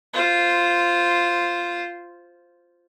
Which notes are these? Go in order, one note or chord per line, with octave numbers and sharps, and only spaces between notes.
F4 C5